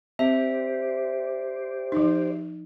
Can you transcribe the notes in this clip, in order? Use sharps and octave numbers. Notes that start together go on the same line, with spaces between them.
C4 G4 C5 D5 E5
F3 D#4